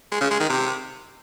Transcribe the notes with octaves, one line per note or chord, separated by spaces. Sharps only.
G#3
C#3
G#3
D#3
C3